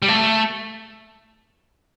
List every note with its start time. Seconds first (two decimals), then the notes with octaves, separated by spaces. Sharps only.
0.02 G3
0.08 A3